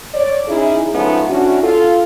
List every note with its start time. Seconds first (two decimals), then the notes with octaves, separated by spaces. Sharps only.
0.14 C#5 D5
0.48 C#4 D#4 E4 G#4
0.93 F3 G#3 A3 B3 C#4 D#4
1.28 C#4 D4 E4 F#4
1.63 F4 A4